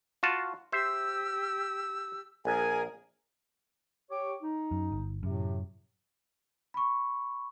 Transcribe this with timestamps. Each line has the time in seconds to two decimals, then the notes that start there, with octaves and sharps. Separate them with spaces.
0.23 F4 F#4 A5
0.72 G4 C5 E5 E6
2.45 A#1 G#4 A#4 G#5
4.10 G4 C#5 D6
4.42 D#4
4.71 F#2
4.92 G1
5.23 F#2 A2 C3
6.74 B5 C#6